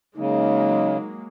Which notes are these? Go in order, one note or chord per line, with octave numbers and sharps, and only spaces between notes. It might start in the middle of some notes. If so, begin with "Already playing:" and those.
C#3 F#3 G#3 A#3 D#4